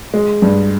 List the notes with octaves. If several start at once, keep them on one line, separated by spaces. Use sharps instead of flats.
G#3
G2